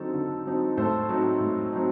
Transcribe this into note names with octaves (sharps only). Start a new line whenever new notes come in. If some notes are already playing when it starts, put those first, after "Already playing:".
Already playing: D3 F#3 C4 D#4 A4
D3
F#3 C4 D#4
A2 A4 C5
F#3 C4 D#4
A2
F#3 C4 D#4